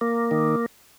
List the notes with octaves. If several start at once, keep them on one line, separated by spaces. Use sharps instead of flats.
A#3
D#3